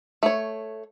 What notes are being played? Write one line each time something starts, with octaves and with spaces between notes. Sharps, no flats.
A3 C#5